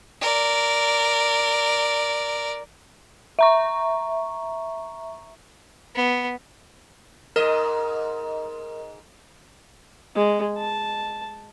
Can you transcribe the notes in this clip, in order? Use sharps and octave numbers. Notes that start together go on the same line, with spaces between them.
A#4 D5
E5 A#5 C#6
B3
G#2 A#4 D#5
G#3
A5